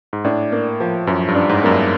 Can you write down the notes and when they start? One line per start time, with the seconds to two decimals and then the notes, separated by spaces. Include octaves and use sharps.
0.13 G#2
0.24 A2 D4
0.52 A#3
0.80 F3
1.07 F#2 F3
1.28 G2
1.35 D4
1.49 G#2
1.63 F#2 A#3
1.70 G2